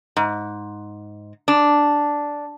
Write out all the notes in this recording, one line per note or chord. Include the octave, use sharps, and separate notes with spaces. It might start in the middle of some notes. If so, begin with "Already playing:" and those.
G#2
D4